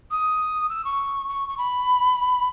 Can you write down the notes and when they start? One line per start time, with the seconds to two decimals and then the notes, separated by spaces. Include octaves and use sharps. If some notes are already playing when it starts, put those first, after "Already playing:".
0.11 D#6
0.69 E6
0.85 C#6
1.28 C#6
1.48 C#6
1.58 B5